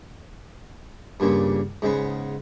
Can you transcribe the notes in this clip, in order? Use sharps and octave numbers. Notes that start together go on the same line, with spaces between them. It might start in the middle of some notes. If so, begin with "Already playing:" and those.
G2 A#2 C#3
G#2 C#3 B3